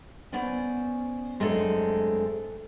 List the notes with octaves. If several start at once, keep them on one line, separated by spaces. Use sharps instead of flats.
B3 C#4 C5 D5 G#5
F#2 G#3 A3 C4 D4 A4